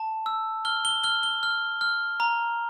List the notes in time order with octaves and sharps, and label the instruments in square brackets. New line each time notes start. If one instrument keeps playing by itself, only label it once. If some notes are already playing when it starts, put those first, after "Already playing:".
Already playing: [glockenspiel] A5
E6
F6 G7
G7
F6 G7
G7
F6
F6
A#5